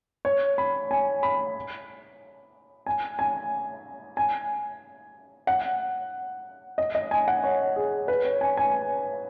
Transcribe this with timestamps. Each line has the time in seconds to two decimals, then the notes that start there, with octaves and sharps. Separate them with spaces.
0.25 C#5
0.58 B5
0.91 G#5
1.23 B5
2.86 G#5
3.19 G#5
4.17 G#5
5.47 F#5
6.78 D#5
6.95 D#5
7.11 G#5
7.28 F#5
7.44 C#5
7.76 G#4
8.08 B4
8.25 C#5
8.41 G#5
8.57 G#5